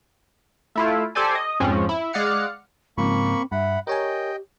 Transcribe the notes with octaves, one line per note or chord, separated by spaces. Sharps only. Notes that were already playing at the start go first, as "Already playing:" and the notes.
A3 E4 F4
G4 A4 C5 D5 G#5
D#5
F2 G#2 F3 C4 C#4
E4
G#3 D5 F5 F#5 F6 C#7
G#2 C#3 F3 A#3 C4 B5 C#6
G2 E5 F#5 B5
G4 A#4 C#5 D#5 G5 G#5